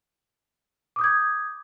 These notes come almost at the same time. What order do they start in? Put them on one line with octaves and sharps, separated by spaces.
D6 D#6 G6 G#6